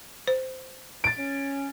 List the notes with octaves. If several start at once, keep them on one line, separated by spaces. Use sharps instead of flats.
C5
A6 D7
C#4